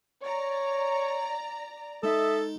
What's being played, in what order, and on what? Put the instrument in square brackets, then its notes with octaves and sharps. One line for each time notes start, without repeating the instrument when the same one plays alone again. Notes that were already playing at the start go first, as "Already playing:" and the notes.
[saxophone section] C#5 [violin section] D5 A#5
[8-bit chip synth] G#3 D#4 [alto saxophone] A4 [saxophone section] D#5 E5